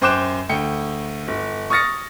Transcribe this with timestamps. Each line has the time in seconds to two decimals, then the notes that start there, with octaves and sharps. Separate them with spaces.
0.01 F#2 C5 G5 D6 F#6 E7
0.49 D2 G5 C#7
1.28 G1
1.70 C#6 D#6 F6 A6 A#6 C#7